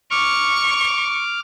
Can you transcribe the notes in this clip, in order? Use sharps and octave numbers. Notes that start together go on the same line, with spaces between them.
C#6 D6 F6